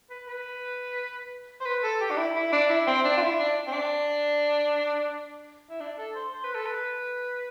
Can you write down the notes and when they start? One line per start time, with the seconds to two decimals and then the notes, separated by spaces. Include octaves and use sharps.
0.10 B4
0.28 B4
1.61 C5
1.66 B4
1.83 A4
2.01 G4
2.10 D4
2.17 E4
2.36 E4
2.52 D4
2.70 E4
2.87 C4
3.04 D4
3.17 F4
3.22 E4
3.39 D4
3.67 C4
3.73 D4
5.70 E4
5.80 D4
5.98 A4
6.15 C5
6.32 C5
6.44 B4
6.54 A4
6.66 B4